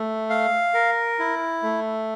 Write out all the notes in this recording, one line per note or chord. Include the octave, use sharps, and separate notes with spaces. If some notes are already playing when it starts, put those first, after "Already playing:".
Already playing: A3
F5
A#4
E4
A3